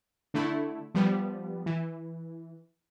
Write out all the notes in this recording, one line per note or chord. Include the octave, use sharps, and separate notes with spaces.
D3 A3 E4
F3 G3 B3
E3